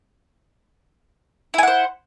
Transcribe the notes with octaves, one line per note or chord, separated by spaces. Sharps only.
E4 C5 F#5 G#5